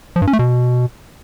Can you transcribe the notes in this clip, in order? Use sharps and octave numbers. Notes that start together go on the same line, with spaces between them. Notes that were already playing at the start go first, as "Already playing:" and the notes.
F3
G2
C#4
A3
B2